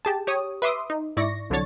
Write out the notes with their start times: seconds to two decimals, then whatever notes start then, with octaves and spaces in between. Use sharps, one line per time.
0.05 G4 G#4 A5
0.27 G4 C#5 D#6
0.62 B4 E5 C6 D6 D#6
0.90 D#4
1.17 G#2 E4 D5 C#6 A#6
1.50 C2 D3 F#3 D4 C#5 A6